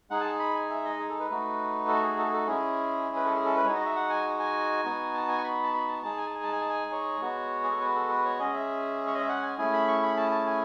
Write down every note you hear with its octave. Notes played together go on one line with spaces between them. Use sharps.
G#3 D#4 G#4 F#5
A5
B5
G#5
E5
D#5
G#4
A4
B4
A3 D#4 F#4
A4
G#4
A4
G#4
A4
G#3 C#4 E4 G#4
B4
A4
G#4
A4
B4
G#3 D#4 F#4 C#5
D#5
E5
F#5
G#5
G#5
B3 D#4 F#4
A5
G#5
C#6
B5
A5
B5
A5
G#3 D#4 G#4 A5
G#5
A5
G#5
A5
G#5
A5
G#5
C#5
G#3 B3 F#4
G#4
A4
B4
A4
B4
C#5
G#3 C#4 G#4 D#5
E5
C#5
D#5
E5
F#5
G#5
A3 C#4 E4 G#4 G#5
B5
C#6
B5
A5
A5
G#5